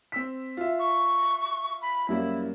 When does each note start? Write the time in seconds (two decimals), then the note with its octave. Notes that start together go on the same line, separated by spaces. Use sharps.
0.12 C4 E6 B6
0.57 F4 E5
0.79 C#6
1.82 B5
2.09 F#2 G3 A#3 E4